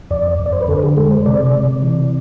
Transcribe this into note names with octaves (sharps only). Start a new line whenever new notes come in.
F2 D5
F2
D5
C5
B4
D3 A4
G#4
G#3 A4
C5
C3 D5
C3
E3